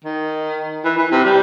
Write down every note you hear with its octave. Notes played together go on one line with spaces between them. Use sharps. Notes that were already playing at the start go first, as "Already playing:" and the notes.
D#3
E3
E3
C3
G3